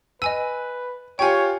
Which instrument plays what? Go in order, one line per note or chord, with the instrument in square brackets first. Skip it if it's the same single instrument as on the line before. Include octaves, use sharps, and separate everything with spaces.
[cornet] B4 [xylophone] D#5 G#5 E6 [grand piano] D#7
[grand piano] F4 G4 C#6 [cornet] C#5 [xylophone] G5 G#5